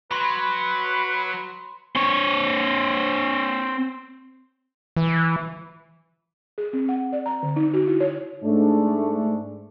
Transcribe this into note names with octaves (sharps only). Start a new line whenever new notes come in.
F#3 B4 B5 C6
C4 C#5
E3
G#4
C4
F#5
D5
A#5
D3
D#4
F#4
E4
C#5
G#2 A3 D4